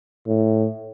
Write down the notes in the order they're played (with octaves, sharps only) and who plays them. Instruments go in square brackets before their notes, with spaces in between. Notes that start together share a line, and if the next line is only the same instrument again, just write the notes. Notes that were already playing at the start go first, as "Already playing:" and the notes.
[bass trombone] A2